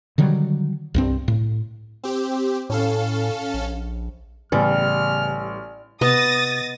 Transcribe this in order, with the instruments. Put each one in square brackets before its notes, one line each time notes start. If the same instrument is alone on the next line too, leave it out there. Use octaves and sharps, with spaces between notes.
[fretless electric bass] D3 D#3 F#3 G3
C2 G2 C4
A2
[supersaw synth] C4 G4
[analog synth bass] A2 [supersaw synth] C#4 A4 F5
[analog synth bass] A#1
[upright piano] A1 [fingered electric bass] C#3 B3 [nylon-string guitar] G3 [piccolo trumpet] F6
[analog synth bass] C3 [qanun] B3 D#5 [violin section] D#6 A6 A#6